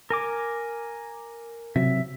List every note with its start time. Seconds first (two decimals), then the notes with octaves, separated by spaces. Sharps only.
0.10 A#4 G#5 D6
1.76 C3 F#3 E5